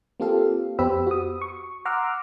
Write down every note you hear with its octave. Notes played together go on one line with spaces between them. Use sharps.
A#3 C4 F4 G4 A4 F5
F2 B3 G4 C5 B5 E6
F#4 D#6
C#6
F#5 A#5 C6 D6 E6 F6